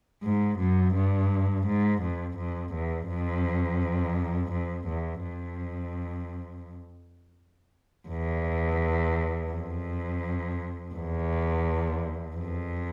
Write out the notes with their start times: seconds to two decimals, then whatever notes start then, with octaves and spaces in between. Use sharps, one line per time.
0.24 G#2
0.59 F#2
0.95 G2
1.67 G#2
2.02 F2
2.38 F2
2.74 E2
3.09 F2
4.53 F2
4.88 E2
5.23 F2
8.09 E2
9.51 F2
10.94 E2
12.36 F2